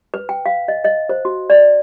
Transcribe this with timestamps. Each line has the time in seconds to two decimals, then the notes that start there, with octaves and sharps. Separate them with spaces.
0.14 B4
0.29 G5
0.46 F5
0.68 D#5
0.84 D#5
1.09 C5
1.25 F#4
1.50 D5